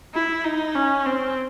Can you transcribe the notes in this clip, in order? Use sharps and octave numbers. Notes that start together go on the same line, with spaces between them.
E4
D#4
C#4
C4